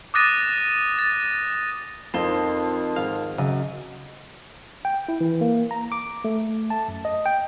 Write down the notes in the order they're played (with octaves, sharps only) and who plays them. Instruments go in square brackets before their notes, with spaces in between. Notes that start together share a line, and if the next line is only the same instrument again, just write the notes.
[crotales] D6 D#6 F#6 A6 A#6 D#7
A6
[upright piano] F2 [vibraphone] C4 D#4 A#4 [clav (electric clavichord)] F4 C5
[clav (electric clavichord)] G#1 F5
[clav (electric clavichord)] F#2 [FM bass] C#3 [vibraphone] D#5
[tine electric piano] G5
E4
E3
A#3
A#5
D6
A3
A5
F#2
D#5
G5